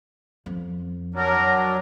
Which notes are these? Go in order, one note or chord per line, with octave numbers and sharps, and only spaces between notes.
F2
F#3 D4 A#4